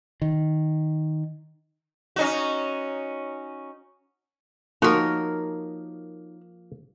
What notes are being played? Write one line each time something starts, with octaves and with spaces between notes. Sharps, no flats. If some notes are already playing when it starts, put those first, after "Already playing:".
D#3
C#4 D#4 F#4
F3 A#3 D#4 F#4 A#4 C#5